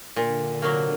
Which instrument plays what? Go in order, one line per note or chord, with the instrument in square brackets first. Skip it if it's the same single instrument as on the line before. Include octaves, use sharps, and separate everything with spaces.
[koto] A#2 [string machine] D3
[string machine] C3 [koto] F#3 A#3